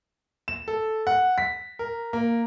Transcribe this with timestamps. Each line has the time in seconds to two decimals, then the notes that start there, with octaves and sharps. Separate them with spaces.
0.48 E7
0.68 A4
1.07 F#5
1.38 B6
1.79 A#4
2.13 A#3